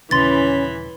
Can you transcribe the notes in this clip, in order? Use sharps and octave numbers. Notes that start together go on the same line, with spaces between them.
D#1 C#3 E3 C#4 B5 C6 A6